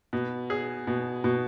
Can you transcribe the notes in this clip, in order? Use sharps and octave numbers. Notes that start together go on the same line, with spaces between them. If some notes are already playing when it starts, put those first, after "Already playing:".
B2
G#4
B2
B2